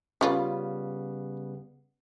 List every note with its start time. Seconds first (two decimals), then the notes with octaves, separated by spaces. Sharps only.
0.21 C#3 G3 B3 C#4 F4 B4